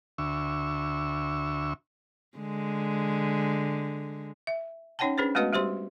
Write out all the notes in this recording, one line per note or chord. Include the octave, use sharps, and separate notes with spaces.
D2 E5 C#6
D3 G#3
E5
C#4 D#4 C#5 F#5 G5 A5
C#4 D4 G#4 B4 C5
G#3 A3 B3 F#4 B4 D#5
G3 F#4 G4 C5 C6